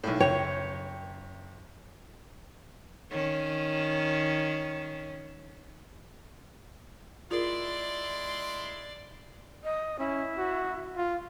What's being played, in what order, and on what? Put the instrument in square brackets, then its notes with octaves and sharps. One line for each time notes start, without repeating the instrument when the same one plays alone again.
[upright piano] B1 A2
[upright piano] F#1 G5 [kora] C#5
[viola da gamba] D#3 C#4
[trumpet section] G#3 E4 C6 [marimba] F4 G#4 A#4 [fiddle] D5
[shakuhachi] D#5
[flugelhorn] C#4 [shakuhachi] E4
[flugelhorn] F#4
F4